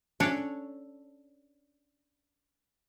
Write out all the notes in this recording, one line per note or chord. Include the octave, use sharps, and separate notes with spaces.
C#4 D4 A4 C#5